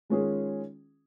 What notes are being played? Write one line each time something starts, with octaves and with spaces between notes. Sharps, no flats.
D#3 G#3 C#4 F4 G#4